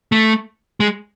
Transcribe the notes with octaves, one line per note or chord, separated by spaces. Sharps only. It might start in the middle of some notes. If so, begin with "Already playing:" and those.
A3
G#3